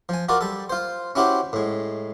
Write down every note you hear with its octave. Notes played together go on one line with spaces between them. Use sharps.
F3 G#5
F4 F#4 A#4 D5
G3 A4
F4 C5
C#4 E4 F#4 G4 C5
A2 G#3